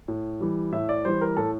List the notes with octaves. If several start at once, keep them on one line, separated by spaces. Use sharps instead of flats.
A2
E3 G3
A2 E5
D5
E3 G3 C5
A#4
A2 A4